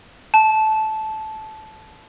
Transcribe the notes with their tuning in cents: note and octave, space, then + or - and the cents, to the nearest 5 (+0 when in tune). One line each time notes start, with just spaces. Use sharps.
A5 -15